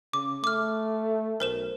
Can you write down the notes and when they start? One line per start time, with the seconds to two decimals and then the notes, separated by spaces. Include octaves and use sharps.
0.13 C#3 D6
0.44 A3 D6 F6
1.40 B1 A#4 C5 E7